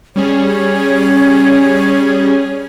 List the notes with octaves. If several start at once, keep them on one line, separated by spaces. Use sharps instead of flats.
G3 C#4 G#4 C#5